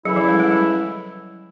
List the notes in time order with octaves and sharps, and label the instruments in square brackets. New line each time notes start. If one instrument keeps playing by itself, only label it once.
[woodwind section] C#3 E3 A3 C#4 E4 [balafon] F#3
[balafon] F3
G3
G#3
F#3